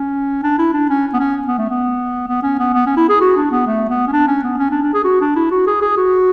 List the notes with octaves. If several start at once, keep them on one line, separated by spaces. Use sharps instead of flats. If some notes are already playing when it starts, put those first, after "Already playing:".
Already playing: C#4
D4
E4
D4
C#4
B3
C#4
B3
A3
B3
B3
C#4
B3
B3
C#4
E4
G#4
F#4
D4
B3
A3
B3
C#4
D4
C#4
B3
C#4
D4
D4
G#4
F#4
D4
E4
F#4
G#4
G#4
F#4